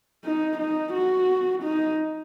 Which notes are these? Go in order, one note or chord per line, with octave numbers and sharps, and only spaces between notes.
D#4
D#4
F#4
D#4